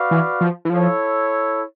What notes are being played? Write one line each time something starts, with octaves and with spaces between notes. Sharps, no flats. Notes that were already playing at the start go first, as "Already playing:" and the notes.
Already playing: F#4 B4 D5 F5
E3
F3
E3
F3 E4 A4 C#5